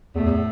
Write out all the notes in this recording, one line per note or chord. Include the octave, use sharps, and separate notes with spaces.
E2 A2 A3
E2